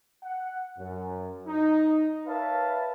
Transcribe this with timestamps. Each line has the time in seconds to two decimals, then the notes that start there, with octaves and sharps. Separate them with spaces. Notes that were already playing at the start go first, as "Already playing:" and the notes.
0.23 F#5
0.78 F#2
1.47 D#4
2.27 A#4 B4 C#5 E5 F5 A5